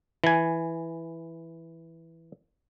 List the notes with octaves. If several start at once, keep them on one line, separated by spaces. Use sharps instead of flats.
E3 G#5